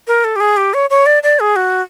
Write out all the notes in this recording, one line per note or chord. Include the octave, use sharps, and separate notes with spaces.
A#4
A4
G4
G#4
G4
C#5
C#5
D5
D5
G#4
F#4